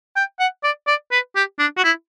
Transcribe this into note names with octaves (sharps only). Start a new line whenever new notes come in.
G5
F#5
D5
D5
B4
G4
D4
F#4
E4